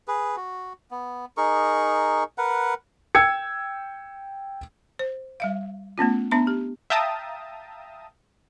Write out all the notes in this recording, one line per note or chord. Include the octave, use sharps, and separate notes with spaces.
G#4 B4
F#4
B3
D#4 G#4 A#4 C#6
A#4 B4 F#5
G5 E6 G#6 C#7
C5
G3 E5 F5
A3 B3 C#4 F4
B3 D4 E5 A#5
G4
E5 F5 G5 A5 A#5 D#6